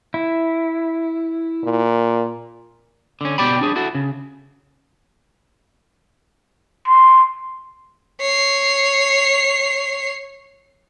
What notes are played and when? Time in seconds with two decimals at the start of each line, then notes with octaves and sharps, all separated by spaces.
0.14 E4
1.64 A#2
3.21 D3 C#4
3.38 B2 G4 D5 G5 B5
3.59 G3 D4 G#4
3.76 E4 F#4 A4
3.95 C#3
6.88 C6
8.20 C#5 C7